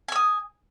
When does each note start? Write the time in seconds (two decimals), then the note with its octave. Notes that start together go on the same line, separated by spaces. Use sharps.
0.08 G#5
0.12 E6
0.16 D#6